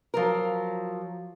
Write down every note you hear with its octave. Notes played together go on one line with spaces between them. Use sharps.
F3 F#3 A#4